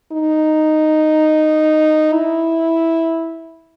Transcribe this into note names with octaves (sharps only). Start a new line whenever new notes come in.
D#4
E4